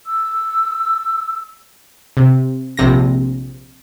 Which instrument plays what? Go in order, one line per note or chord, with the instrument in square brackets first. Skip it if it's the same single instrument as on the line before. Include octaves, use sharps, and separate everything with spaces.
[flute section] E6
[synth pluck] C3
A#1 C3 A#6